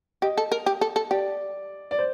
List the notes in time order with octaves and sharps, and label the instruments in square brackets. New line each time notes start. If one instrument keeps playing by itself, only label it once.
[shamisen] G4 [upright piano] D#5
[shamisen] A4
A#4
G4
A4
A4
[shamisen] G4 [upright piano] D5
[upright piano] D5
C5